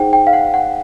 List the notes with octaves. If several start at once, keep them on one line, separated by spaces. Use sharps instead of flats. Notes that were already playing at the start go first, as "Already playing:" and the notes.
Already playing: D#4 G#4 C5 F#5 G5
G5
F5
F#5
F#5